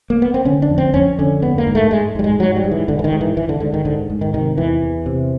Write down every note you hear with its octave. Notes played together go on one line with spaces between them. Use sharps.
A#3
B3
C4
D3 C#4
D4
F2
C4
F2 C#4
D3 C#4
G#2 B3
A#3
G#2
A3
G#2 G#3
G#2 G3
G#3
G#2 F#3
G3
G#2
E3
G#2 D3
E3
D#3
G#2
E3
G#2 E3
D3
G#2 D3
D#3
G#2 D3
G#2
D#3
C3 D#3
E2 E3
E2
C3